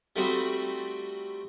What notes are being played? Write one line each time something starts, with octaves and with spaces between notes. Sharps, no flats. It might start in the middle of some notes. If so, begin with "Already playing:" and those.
G3 A3 C4 D#4 F#4 B5